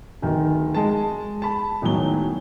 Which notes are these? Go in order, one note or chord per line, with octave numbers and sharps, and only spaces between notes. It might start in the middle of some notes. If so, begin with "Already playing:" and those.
D1 D#3
G#3 A5
A5 B5
E1 A2 D#3 F#3 G7